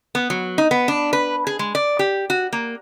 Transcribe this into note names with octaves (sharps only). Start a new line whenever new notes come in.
B3
F#3
D#4
B3
D4
B4
G#4
G#3
D5
G4
F#4
A#3